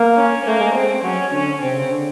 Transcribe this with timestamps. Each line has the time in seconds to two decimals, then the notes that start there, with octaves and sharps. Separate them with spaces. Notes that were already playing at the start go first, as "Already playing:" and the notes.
Already playing: A#3
0.17 C#4
0.46 A3 A#3
0.60 G#3
0.75 C4
1.03 F#3 C#4
1.33 D3 C#4
1.62 C3 C4
1.76 C#3
1.90 D3